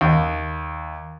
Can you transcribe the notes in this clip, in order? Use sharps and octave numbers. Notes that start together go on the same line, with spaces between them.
D#2